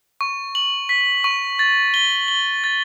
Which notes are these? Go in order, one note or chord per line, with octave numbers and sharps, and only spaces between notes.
C#6
F#7
B6
C#6
A6
G7
G7
A6